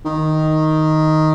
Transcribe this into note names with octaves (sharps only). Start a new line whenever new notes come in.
D#3